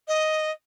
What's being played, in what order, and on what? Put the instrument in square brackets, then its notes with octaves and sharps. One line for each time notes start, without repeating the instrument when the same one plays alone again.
[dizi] D#5